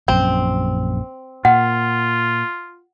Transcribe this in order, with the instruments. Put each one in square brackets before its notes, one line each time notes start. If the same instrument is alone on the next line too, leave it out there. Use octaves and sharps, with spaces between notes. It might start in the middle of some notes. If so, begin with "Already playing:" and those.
[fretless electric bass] A#1 F#2 [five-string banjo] C4
[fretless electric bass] A#2 [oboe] F4 [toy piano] F#5